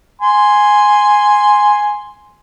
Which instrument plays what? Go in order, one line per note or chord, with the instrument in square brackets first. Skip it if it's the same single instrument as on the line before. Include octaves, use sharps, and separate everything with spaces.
[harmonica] G#5 C6